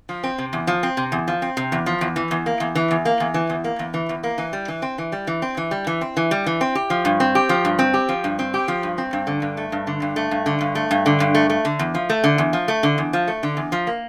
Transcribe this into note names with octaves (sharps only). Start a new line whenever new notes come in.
F3
C4
C3
E2
F3
C4
C3
E2
F3
C4
C3
E2
F3
E2
E3
E2
A#3
E2
E3
E2
A#3
E2
E3
E2
A#3
E2
E3
E2
A#3
E3
G3
E3
C4
E3
G3
E3
C4
E3
G3
E3
C4
E3
G3
E3
C4
G4
F3
G2
C4
G4
F3
G2
C4
G4
F3
G2
C4
G4
F3
G2
C4
G2
D3
G2
A3
G2
D3
G2
A3
G2
D3
G2
A3
G2
D3
G2
A3
A3
D3
E2
F3
A3
D3
E2
F3
A3
D3
E2
F3
A3
D3
E2
F3
A#3